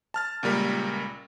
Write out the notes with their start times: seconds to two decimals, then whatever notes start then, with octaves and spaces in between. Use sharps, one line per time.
0.14 A5 F6 A6
0.43 C#2 A#2 G3 A#4